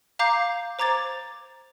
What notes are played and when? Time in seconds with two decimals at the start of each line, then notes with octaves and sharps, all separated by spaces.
0.19 F5 A#5 D6 G6 C7
0.79 C5 A#5 D6 G#6 A6